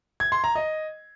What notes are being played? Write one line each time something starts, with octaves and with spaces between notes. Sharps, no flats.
G#6
C6
A#5
D#5